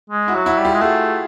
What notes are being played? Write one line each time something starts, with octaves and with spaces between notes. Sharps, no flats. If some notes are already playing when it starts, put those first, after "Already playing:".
G#3
E4 F#4
F#3
E4 F#4
G3
F4 G4
G#3
A3 F#4 G#4